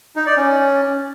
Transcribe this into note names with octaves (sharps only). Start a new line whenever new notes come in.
D#4
D5
C#4